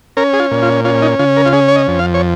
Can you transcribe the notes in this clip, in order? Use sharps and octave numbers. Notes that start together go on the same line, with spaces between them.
C#4 A#4
G#4
F4
A#2
F4
C#4 F4
D#4
C#3 F4
A#4
F4
C#4 G#4
C#5
D#5
F2
F5
C#5